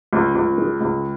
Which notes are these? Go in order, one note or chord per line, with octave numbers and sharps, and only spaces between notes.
C#2
C#2
G#3
C#2